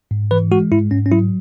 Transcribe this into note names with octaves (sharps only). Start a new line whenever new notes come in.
G#2
E3 B4
G#3 F#4
G#2 E4
G#2 C#4
C#4
F#3 E4